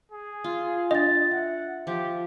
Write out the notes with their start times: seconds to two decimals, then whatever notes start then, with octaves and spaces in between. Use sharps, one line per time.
0.11 G#4
0.44 F4
0.91 D4 D#5 A6
1.31 E5 F#5
1.87 F3 G4